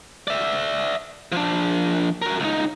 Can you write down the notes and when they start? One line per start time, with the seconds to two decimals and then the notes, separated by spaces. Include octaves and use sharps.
0.28 D5 E5
1.32 F3 D4
2.22 F#4 A#4
2.40 C#2 D#4